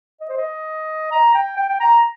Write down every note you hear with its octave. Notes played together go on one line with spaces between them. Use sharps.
D#5
C5
D#5
A#5
G5
G5
G5
A#5